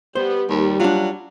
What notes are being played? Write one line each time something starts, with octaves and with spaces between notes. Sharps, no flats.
G3 B3 C5
D#2 G3
F#3 D4 F4